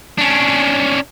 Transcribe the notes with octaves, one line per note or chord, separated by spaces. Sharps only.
C#4 D4